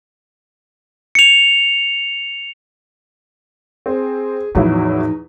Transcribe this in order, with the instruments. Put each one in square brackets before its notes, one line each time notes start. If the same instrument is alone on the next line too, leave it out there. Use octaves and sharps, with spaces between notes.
[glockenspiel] C#7 F7
[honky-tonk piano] C4 [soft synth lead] G#4
[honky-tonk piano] E2 F#3 E4 [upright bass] A2 F3 [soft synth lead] D#4